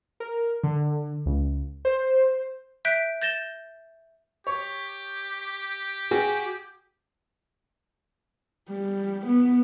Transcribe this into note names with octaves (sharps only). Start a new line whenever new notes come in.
A#4
D3
C#2
C5
E5 F#6 G6 B6 D7
G6 A6 A#6 E7 G7
G4 C#5
F#4 G#4 G5
G3
B3